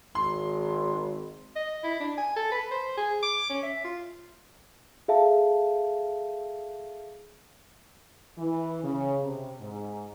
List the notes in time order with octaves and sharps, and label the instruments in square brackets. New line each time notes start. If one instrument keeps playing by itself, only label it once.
[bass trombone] G#1 [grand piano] C6
[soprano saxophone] D#5
E4
D4
G#5
A4
B4
C5
G#4
D6
C#4
E5
F4
[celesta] G#4 A4 E5 F5 A5
[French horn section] E3
C#3
C3
G#2